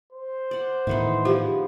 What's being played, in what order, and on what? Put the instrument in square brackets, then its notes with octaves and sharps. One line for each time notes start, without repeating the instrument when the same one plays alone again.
[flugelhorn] C5
[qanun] D5 F#5
[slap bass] A2 D#3 [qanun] E3 B3 D#4
[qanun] F3 B3 G#4 [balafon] G4